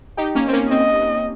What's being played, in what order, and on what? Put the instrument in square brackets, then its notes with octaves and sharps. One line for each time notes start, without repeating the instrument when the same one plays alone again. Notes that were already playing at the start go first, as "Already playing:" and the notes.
[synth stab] D#4 G4
A#3 C#4
C4
A#3 C#4
[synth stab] C4 [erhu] D#5